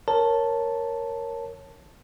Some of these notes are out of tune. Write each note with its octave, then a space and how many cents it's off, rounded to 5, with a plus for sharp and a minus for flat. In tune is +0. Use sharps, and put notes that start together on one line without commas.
A#4 +0 C#5 -10 A5 +0